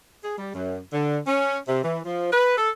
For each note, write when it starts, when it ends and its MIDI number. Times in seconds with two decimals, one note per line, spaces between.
0.23 0.35 68
0.37 0.53 55
0.53 0.78 42
0.93 1.17 50
1.26 1.57 61
1.67 1.81 48
1.83 1.98 52
2.05 2.30 53
2.32 2.55 71
2.57 2.69 69